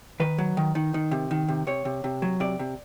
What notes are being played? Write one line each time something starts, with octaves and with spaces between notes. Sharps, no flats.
D#3 B4
F#3
D#3
D#3
D#3
C3
D#3
C3
C3 C#5
C3
C3
F#3
C3 D5
C3